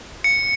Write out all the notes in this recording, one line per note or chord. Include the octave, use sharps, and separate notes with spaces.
C#7